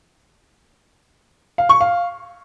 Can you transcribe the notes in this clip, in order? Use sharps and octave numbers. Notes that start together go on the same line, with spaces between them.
F5
C#6
F5